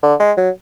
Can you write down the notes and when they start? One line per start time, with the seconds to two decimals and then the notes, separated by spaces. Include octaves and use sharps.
0.02 D3
0.20 G#3
0.37 F#3